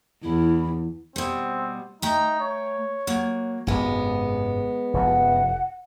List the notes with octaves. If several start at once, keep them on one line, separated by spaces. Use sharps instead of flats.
E2 E4
B2 G3 C4
A3 D#4 G5 A#5
C#5
F#3 A#3
G#1 F#2 C3 G#3 B3
F1 F#2 F3 F#5